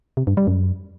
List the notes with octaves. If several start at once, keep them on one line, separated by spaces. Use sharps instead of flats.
C3
G2
G3
F#2